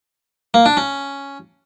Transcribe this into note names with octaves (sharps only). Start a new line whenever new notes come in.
A#3
D4
C#4